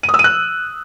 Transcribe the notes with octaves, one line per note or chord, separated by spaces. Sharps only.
D#7
D#6
E6
D#7
F#6